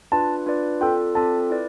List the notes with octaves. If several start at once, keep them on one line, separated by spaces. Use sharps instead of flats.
D4 F4 B4 D5 A5
D4 F4 B4 D5
C4 F4 A4 D5 G5
C4 F4 A4 D5 A5
E4 B4 D5